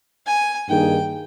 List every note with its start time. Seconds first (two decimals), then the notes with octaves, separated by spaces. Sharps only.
0.27 G#5
0.69 G2 D#3 A#3 D#4 G#4 G5